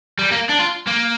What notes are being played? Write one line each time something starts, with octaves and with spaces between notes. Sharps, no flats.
G3
A#3
D4
F4
A#3